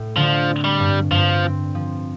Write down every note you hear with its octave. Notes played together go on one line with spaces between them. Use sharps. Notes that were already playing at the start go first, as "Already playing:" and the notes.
Already playing: A2
D3 F3
C4
G3
G2
G2 F3
C4
F3